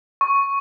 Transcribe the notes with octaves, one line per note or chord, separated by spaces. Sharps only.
C#6